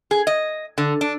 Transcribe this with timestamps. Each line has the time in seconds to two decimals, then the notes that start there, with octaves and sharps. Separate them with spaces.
0.11 G#4
0.27 D#5
0.78 D3
1.01 D4